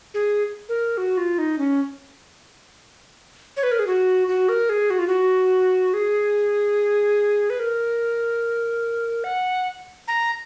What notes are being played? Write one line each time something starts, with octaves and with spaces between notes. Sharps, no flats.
G#4
A#4
F#4
F4
D#4
C#4
C#5
B4
A#4
G#4
F#4
F#4
A#4
G#4
F#4
F4
F#4
G#4
B4
A#4
F#5
A#5